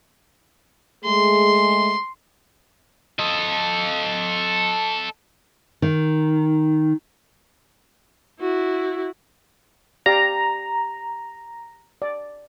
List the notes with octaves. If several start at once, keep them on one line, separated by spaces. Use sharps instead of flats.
G#3 A3 G#4 C6
A4 D#5
D#3
E4 F#4
G4 D5 F5 A#5
D5